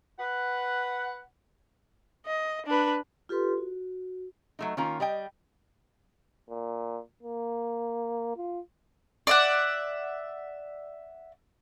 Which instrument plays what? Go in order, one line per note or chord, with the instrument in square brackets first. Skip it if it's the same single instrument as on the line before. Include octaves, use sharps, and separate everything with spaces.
[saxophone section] B4 F#5
[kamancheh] D#5
D4 B4
[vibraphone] F4 G4 A4 B4 C6
F#4
[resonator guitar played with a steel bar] F#3 A3 D#4
D#3 A#3 C#4 F4 A#5
G3 D#5 G5
[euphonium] A#2
A#3
F4
[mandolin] D5 E5 F#5